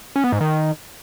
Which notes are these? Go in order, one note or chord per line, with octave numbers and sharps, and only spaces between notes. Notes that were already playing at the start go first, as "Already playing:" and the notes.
C#4
B3
G#2
D#3